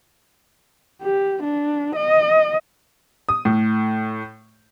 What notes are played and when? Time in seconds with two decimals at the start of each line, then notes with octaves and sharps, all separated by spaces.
1.02 G4
1.43 D4
1.96 D#5
3.29 D#6
3.45 A2